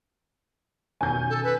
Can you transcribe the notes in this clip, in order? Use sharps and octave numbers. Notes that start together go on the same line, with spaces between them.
B2 D#3 C#4 G#5 G6
A4
B4